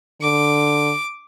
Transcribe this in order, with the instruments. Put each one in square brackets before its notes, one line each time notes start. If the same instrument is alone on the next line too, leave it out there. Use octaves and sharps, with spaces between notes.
[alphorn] D3 [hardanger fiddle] D6